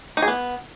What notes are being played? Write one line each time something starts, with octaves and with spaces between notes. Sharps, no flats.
D#4
G#4
B3